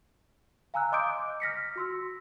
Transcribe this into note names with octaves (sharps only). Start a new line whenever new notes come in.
F5 G#5 A#5 E6 F#6
D#5 C6 D6 D#6 G6 D7
F6 A#6 B6 C#7
F#4 C6 E6